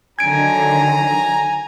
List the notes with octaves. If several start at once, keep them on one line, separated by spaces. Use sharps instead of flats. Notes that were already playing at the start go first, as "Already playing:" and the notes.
D3 D#3 F#3 G#5 A#5 G#6 D7